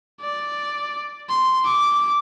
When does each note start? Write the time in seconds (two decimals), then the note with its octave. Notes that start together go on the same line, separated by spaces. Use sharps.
0.21 D5
1.29 C6
1.65 D6